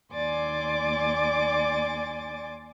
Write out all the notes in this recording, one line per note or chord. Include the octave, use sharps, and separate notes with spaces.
D#2 D5 G#5 C6 D6 A6